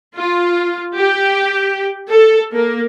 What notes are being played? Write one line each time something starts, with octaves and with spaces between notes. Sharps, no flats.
F4
G4
A4
A#3